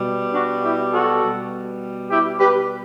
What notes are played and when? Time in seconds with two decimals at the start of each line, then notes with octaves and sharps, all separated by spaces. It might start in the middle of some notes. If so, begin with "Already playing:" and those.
Already playing: B2 G3
0.34 D4 F#4
0.64 E4 G4
0.93 F#4 A4
1.22 B2 G3
2.10 E4 G4
2.39 G4 B4